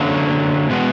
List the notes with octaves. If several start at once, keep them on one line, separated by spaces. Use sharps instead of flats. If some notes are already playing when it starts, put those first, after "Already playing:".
Already playing: F#2 D3 F#3 A#3 C#4
B2 G#3 B3